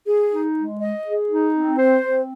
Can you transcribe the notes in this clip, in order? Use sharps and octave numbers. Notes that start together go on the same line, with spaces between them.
G#4
D#4
G#3
D#5
G#4
D#4
C4
C5
C4